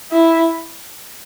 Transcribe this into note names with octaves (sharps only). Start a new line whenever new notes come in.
E4